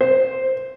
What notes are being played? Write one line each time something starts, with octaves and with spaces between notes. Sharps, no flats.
C5